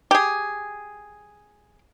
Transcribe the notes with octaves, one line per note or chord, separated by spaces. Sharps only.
G4 G#4